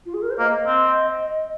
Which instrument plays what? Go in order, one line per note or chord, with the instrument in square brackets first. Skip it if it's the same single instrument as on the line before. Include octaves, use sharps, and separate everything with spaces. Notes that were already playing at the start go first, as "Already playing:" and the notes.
[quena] F4
G#4
A#4
C5
[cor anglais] A#3 [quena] D#5
[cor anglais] C4